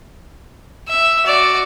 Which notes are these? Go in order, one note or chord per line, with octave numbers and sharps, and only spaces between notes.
E5
F#4 D5